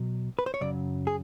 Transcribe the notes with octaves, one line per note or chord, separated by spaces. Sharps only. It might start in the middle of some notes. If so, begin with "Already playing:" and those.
Already playing: B2 F#3
B4
C5
C#5
F#2 C#3 F#3 D5
G#4